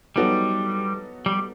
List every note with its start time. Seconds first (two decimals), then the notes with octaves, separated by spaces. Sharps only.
0.16 F#3 G3 B3 D#4 F#4 A4
1.26 G3